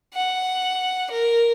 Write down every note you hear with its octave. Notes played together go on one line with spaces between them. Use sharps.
F#5
A#4